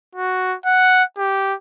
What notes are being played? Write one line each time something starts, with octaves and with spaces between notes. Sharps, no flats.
F#4
F#5
G4